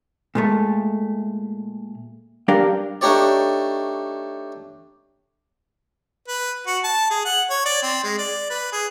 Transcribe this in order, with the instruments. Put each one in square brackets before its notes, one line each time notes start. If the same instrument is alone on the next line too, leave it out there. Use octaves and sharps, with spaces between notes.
[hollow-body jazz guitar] A#2 G#3 A3
G3 D4 A#4 F5 G5
[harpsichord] A3 D4 D#4 G4 C#5 D5
[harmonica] B4
F#4
A5
G#4
F#5
C#5
D5
C4
G#3
D5
B4
G#4